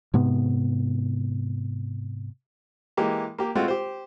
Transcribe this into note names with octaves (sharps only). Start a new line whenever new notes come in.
G#2 C3 B3
E3 G#3 A#3 G4
A#3 G4
G#3 A3 C4 F4 F#4
G4 C5